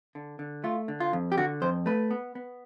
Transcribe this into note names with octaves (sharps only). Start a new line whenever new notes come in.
D3
D3
A3 F4
D3
F4
F2
G4
D3 F#4
F2 C5
A3 B4
B3
B3